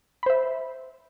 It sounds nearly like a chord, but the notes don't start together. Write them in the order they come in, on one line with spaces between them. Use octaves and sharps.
B5 C5 E5